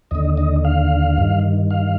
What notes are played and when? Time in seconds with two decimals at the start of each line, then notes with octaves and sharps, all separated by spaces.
0.11 D#2 D3 D#5
0.37 D#5
0.65 F5
1.18 G2 D#3
1.71 F5